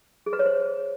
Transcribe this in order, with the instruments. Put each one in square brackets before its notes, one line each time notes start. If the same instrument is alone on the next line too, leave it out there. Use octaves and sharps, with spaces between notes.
[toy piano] G#4
B4
C#5
C5